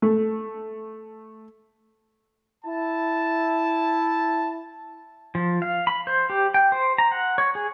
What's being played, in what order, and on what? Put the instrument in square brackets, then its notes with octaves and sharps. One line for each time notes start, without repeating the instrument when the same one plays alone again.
[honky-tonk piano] A3
[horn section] E4 A5
[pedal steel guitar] F3
F5
B5
C5
G4
G5
C5
A#5
F#5
C#5
G#4